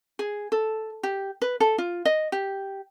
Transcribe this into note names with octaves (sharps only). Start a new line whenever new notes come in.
G#4
A4
G4
B4
A4
F4
D#5
G4